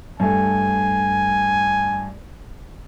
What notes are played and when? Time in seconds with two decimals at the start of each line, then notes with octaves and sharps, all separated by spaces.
0.20 G2 A3 G#5